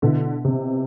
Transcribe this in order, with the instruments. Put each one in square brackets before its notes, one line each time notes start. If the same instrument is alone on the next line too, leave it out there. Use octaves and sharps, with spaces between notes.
[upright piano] B2 B3 E4 [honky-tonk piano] D3
[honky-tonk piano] C3